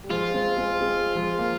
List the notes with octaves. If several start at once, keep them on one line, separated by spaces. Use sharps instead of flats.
G3
F3 G#3 F4
G#3 C4
G#3 C4
G#3 C4
F3 G#3
A#3